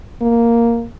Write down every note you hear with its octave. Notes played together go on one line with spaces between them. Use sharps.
A#3